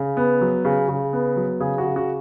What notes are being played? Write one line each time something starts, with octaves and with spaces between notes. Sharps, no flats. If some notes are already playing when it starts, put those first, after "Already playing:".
Already playing: C#3
B3
F#3
C#3
C#3
B3
F#3
C#3 G#4
F#4
C#3
F#4